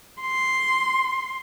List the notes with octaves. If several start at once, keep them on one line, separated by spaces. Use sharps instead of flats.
C6